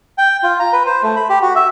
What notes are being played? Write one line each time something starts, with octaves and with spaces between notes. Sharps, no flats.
G5
F4
A#5
B4
C5
A3
B5
G4
F#4
E5